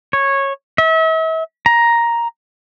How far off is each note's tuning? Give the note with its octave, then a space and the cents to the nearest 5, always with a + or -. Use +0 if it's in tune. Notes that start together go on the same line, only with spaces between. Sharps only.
C#5 -15
E5 -40
A#5 +5